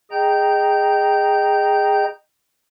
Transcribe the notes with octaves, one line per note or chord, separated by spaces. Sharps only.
G#4 D#5 G5 A#5 G6